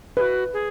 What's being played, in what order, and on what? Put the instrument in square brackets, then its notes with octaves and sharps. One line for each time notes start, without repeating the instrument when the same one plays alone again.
[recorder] G#4 [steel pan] B4
[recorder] F#4
G#4